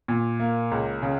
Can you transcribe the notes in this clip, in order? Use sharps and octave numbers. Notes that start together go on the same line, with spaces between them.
A#2
A#3
C#2
C#3